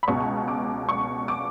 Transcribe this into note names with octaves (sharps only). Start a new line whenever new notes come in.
B5
C#2 B2 C#6
D6
C#6
D6